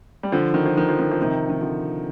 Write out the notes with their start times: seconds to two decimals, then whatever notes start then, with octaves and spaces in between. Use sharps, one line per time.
0.23 G3
0.32 D3 F3
0.54 D#3
0.66 F3
0.78 D#3
0.89 F3
1.00 D#3
1.11 F3
1.22 C3 D#3
1.50 D#3
1.61 D3 F3